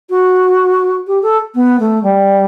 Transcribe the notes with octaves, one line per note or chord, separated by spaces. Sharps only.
F#4
G4
A4
B3
A3
G3